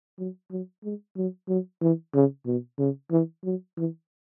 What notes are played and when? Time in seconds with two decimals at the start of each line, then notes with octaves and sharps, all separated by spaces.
0.19 F#3
0.51 F#3
0.84 G#3
1.17 F#3
1.49 F#3
1.82 E3
2.15 C#3
2.47 B2
2.79 C#3
3.11 E3
3.44 F#3
3.77 E3